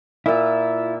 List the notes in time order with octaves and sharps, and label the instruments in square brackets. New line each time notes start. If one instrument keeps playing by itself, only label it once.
[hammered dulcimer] A#2 E5 [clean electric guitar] E4 F4